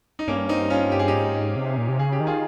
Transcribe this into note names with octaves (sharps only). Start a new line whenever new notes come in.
D#4
G2 A#3 C#4
C4 D#4
C#4 F4
G4
G#4
D#4 G4
G#2
C3
A#2
C3
C#3 G#4
G4
D#3
F4 G#4